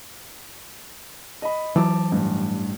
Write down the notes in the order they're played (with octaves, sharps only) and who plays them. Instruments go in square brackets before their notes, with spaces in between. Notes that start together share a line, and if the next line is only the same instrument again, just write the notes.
[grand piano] D#5 B5
[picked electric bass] E3 F#3 [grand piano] A5 D6
[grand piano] A1 G2